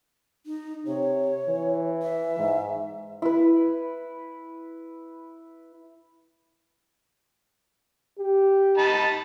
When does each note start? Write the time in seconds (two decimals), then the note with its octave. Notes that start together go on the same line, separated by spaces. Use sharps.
0.46 D#4
0.87 C3 C#5
1.48 E3
2.02 E5
2.39 G#2
3.22 E4 B4
8.19 G4
8.78 D#4 A5 B5